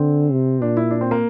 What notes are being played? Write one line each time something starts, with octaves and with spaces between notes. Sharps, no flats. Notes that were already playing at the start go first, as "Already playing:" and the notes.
Already playing: D3 C4
C3
A#2 D4
E4
D4
C4
A#3